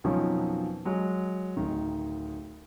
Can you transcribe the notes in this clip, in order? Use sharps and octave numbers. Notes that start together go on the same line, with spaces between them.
F2 B2 D#3 F3 F#3 C#4
F#3 G#3
D1 D#3